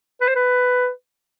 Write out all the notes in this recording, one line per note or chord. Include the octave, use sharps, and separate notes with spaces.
B4
C5
B4